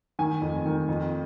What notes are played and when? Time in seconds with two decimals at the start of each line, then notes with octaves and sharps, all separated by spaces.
0.19 D#3 G#5
0.41 F2
0.65 D#3
0.89 F2